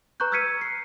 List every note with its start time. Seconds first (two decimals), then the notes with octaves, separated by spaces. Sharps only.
0.20 B4 A#5 C#6 F#6 G6
0.32 E6 F6 G#6 B6 C#7 D#7
0.61 C7